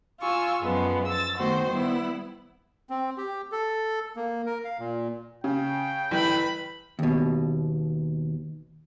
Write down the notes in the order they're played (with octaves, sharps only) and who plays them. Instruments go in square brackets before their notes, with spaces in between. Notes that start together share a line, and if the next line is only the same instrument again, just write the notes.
[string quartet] F4 G#5 C#6 E6
F#2 F3 G#3 B3
E6 A6
D#3 A3 B3 F#4 C5
G3 B3 E4
[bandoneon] C4
G4
A4
A#3
A#4
F5
A#2
[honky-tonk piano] C#3 [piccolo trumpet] G5
[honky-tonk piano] G1 E3 [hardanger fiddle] B4 B5
[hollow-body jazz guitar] D#2 B2